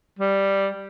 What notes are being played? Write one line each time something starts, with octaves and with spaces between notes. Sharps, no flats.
G3